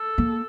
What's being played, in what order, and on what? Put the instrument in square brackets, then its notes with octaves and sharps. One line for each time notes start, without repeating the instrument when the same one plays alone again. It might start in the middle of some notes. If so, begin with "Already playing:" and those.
Already playing: [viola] A4
[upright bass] A#3